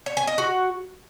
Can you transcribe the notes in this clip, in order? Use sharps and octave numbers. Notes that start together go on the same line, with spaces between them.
C#5
G#5
D#5
F#4